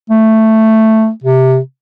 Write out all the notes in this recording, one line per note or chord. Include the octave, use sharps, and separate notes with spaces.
A3
C3